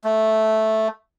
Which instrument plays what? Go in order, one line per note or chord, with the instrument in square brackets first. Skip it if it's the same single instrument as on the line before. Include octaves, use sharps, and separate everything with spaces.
[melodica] A3